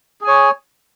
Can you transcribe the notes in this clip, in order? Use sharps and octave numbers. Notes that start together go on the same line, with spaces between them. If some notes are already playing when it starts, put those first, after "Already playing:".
G#4 C#5 G#5